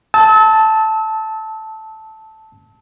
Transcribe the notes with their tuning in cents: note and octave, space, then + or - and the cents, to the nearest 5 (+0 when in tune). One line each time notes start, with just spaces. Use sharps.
A5 +0 E6 -35